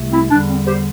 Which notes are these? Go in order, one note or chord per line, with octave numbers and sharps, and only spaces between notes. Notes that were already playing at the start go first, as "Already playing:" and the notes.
Already playing: C2 C3 A3
C4 E4
E2 D3 G3 D4
C4
G4 C5